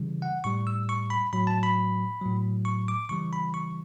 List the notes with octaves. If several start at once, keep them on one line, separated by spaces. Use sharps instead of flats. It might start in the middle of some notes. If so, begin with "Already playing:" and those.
Already playing: C#3 E3 G3
F#5
A2 G3 C#6
E6
C#6
B5
A2 F#3 B5
A5
B5
A2 F#3
C#6
D6
C#3 E3 G3 C#6
B5
C#6